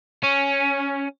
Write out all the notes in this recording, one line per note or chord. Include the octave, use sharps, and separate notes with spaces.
C#4